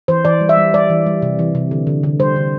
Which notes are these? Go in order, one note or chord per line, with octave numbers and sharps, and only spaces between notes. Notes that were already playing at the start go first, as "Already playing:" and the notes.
E3 C5
E3 D5
G3
E5
G3
G3 D5
E3
G3
C3
E3
C3
D3
D3
D3
G3 C5
D3